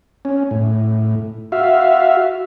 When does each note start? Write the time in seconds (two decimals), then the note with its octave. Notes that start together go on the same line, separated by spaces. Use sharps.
0.25 C#4
0.51 A2
1.52 F#4 E5 F5